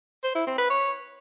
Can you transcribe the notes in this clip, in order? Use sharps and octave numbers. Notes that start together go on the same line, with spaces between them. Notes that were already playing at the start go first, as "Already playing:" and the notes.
C5
E4
C4
B4
C#5